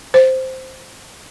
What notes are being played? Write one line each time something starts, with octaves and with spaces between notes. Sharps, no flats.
C5